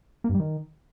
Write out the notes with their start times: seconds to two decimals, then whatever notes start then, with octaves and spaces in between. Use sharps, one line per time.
0.24 A#3
0.29 G2
0.34 G3
0.40 D#3